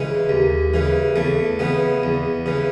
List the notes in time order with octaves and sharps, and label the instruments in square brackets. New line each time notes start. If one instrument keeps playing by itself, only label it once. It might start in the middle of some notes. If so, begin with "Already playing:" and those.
Already playing: [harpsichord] C#3 E3 G#3
D#2
C#3 E3
E2 A3
C#3 E3 B3
E2
C#3 E3